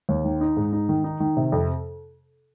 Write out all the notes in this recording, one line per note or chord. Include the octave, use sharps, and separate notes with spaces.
D#2
D#3
D#4
G#2
D#4
D#3
D#4
D#3
C3
F2